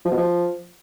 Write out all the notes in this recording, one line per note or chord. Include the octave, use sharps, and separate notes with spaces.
F3
B2
F3